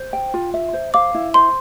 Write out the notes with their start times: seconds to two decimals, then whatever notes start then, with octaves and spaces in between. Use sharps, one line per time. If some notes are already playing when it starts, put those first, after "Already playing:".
Already playing: C5
0.13 G5
0.34 F4
0.54 E5
0.73 C5
0.94 F5 D6
1.15 E4
1.34 C5 C6